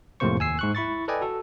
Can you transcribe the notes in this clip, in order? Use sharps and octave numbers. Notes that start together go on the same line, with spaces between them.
F2 A2 C3 A#3 C5 C#6
D#2 G#5 E6 C7
G#2 C#6 F#6
E4 B5 C#6 A6
A4 B4 D5 D#5 G5 G#5
F#4 A4